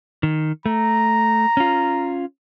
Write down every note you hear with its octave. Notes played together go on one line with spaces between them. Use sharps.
D#3
A3 A#5
C#4 F4